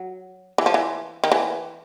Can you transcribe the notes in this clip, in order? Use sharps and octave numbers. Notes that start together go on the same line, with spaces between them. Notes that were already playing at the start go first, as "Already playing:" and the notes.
Already playing: F#3
E3
F3
E3
D#3
E3